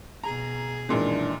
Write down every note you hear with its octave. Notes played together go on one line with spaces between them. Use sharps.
B2 G#4 A#5
F#2 A#2 D#3 E3 G#3 D4